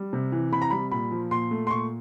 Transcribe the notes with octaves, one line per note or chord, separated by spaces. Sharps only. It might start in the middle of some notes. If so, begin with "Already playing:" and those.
Already playing: G3
C3
E3
C3 B5
A#5
G3 B5
A#2 B5
F3
A#2 C6
A3
C6
A#2 C#6